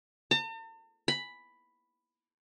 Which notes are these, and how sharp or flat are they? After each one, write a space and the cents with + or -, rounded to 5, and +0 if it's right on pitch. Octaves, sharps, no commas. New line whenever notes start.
A5 +45
B5 +5